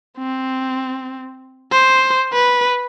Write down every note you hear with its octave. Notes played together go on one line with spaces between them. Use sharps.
C4
C5
B4